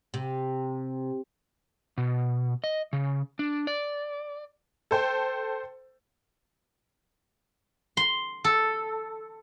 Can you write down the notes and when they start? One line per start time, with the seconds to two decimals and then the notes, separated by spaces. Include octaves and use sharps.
0.14 C3
1.98 B2
2.64 D#5
2.93 C#3
3.39 D4
3.67 D5
4.91 A4 C5 G5
7.97 C6
8.44 A4